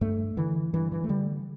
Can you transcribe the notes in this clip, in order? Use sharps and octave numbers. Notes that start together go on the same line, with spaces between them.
G2 A3
D3 E3
G2 E3
E3
A3
D3 G3